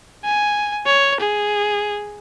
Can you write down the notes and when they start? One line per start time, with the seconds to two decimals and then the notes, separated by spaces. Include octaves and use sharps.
0.25 G#5
0.86 C#5
1.20 G#4